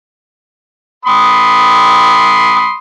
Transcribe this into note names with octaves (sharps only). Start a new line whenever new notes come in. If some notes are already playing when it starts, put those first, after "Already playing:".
B5 C6 D#6